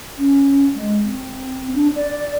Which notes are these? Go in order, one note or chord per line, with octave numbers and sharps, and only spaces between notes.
C#4
G#3
C4
D4
D5